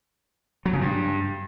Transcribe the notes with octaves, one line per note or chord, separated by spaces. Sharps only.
F#3
C#3
G2